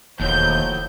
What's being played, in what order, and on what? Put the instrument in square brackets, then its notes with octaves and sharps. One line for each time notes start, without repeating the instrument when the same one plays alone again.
[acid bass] E1 [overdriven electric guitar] D#2 [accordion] A2 F3 F#3 [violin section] G6